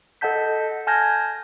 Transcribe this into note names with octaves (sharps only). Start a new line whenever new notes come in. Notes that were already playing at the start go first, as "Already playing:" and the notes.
A4 D#5 F#5 A5 G6 B6
G#5 A5 F6 G6 G#6 A#6